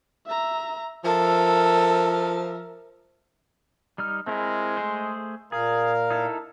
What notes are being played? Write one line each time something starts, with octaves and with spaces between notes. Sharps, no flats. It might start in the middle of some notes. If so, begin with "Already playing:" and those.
E5 A#5
F3 A4 A#4 E5
G3 D#4 F6
G#3 C4 E4 A#4
A3 G#4 C5
A#2 G#4 A#4 F5
D#4 E4 A4